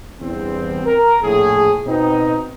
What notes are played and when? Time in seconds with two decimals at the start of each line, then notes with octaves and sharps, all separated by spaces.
0.21 E2 G2 C4
0.86 A#4
1.22 A#1 A2 G#4
1.86 B2 C4 D#4